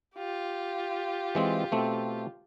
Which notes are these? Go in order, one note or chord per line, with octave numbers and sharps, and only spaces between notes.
F4 G4
E3 G#3 C4
B2 A3 C4